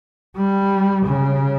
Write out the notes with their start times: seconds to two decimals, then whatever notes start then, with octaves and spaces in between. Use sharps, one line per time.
0.36 G3
1.06 C#3